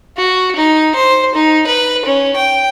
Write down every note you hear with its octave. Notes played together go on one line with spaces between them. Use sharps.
F#4
D#4
C5
D#4
B4
C#4
G5